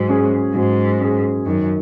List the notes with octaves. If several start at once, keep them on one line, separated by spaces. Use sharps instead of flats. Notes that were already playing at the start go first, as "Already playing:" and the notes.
Already playing: G#2 F#3
C#4 G#4
G#2 F#3
C#4 G#4
F#2 D#3